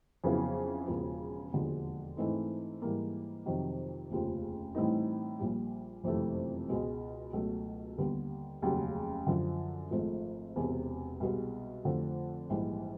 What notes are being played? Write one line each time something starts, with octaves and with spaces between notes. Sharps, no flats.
F2 C#3 F#3 B3 E4
E1 E2 C#3 F3
E1 D#2 D3 F3 G#3
G#2 E3 A3 C4 D#4
G#2 E3 G3 A#3
F2 C3 D#3 F#3
F1 D#2 C#3 F3
A2 E3 G3 C4 D#4
A#1 A#2 G3
F#1 F2 C3 E3 A3
C#2 B2 G#3
C#2 B2 F#3 A3
D#2 D3 G3 B3
F1 D#2 C#3 F#3
F#2 D3 F3
G#1 G#2 F3 A3
E1 E2 C3
C2 B2 G#3 B3
F2 D3 F3 A3
A#1 G#2 E3 G3